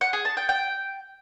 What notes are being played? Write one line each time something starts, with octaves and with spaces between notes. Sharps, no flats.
F#5
G#4
A5
G5
G5